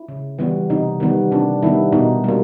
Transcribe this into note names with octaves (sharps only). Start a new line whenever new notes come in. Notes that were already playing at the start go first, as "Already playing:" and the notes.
Already playing: E4
C#3
E3 G3 B3
C3 D#4
D#3 G3 B3
C3 D4
D#3 G3 B3 E4
B2 D#4
G3 A#3